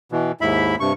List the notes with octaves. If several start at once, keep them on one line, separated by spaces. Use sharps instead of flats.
B2 E3
D#2 G#2 E4 E5 B5
G2 C3 C#6